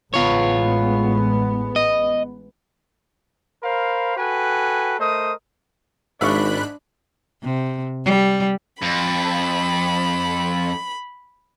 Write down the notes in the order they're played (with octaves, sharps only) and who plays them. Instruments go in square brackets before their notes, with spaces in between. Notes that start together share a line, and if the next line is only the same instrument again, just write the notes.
[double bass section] A1 G#3 B3 [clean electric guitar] F4 C#5
[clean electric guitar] D#5
[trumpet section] A#4 C5 F5 B5
F#4 A4 B4 G5 G#5
A3 A#4 C5 D#5 D#6
[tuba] G#1 [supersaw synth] G#2 B5 F#6 [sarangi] D4 [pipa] E5 F5 C#6
[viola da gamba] C3
G3
[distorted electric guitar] F2 [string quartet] B5